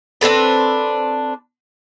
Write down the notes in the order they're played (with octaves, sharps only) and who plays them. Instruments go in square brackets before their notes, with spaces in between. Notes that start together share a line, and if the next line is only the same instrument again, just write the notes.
[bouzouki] C4 D4 A4 B4